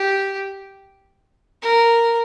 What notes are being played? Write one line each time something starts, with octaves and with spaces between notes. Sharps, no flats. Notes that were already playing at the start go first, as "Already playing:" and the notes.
Already playing: G4
A#4